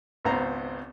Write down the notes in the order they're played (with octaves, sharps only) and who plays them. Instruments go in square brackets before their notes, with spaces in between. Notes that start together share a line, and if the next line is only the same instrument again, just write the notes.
[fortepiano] G#1 C#2 B3 C5 A#5